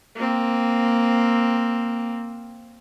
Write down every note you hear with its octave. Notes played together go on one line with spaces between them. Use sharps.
A#3 C4